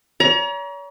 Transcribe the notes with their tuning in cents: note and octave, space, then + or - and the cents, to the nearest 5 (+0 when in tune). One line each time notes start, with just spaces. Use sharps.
C#5 +40 A#5 +35